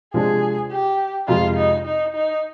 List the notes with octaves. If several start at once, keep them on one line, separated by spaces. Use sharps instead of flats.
C3 F3 G#3 D4 G#4
G4
F2 C3 F3 G#3 F4
D#4
D#4
D#4